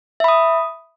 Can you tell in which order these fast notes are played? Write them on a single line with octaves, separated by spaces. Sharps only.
E5 B5 D#6